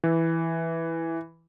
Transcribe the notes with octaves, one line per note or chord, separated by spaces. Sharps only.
E3